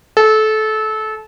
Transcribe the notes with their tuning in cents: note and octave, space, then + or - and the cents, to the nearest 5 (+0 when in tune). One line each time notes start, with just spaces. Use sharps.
A4 -25